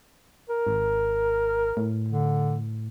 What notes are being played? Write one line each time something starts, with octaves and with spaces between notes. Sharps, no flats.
A#4
G#1
A2
D3